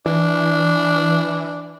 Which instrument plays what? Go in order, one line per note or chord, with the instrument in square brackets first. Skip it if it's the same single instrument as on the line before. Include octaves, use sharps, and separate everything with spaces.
[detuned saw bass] E3 [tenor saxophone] D4